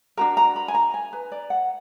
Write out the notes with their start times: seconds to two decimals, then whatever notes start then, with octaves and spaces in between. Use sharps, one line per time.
0.17 D4 F#4 A#4 A#5
0.37 A#5
0.56 B5
0.68 G#5
0.75 A#5
0.94 G#5
1.13 B4
1.32 D5
1.50 F#5